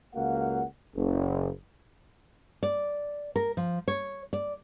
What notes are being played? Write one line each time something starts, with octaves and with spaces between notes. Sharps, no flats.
C#2 A#3 F#4 F5 F#5
F#1
D5
A#4
F3
C#5
D5